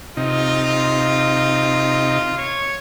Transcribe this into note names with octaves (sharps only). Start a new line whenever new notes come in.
C3 D#4 F4
C#5